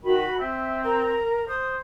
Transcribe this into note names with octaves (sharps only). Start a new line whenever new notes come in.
D#3 F#4 B5
C4 E5
A#4 A#5
C5 D#6